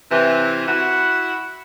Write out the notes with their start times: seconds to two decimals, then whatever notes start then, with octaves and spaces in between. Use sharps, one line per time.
0.11 C3 E3
0.67 E4 F#4 F#5